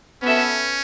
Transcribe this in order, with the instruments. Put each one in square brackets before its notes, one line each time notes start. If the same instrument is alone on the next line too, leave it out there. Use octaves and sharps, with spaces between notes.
[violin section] B3 F#4 A4 E5 A5 [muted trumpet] C#4